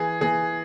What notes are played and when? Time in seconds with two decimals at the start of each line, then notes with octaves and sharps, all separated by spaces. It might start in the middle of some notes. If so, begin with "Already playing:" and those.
Already playing: E3 G#4
0.21 E3 G#4